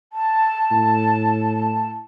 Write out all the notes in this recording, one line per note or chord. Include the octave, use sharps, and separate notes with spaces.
A5
A2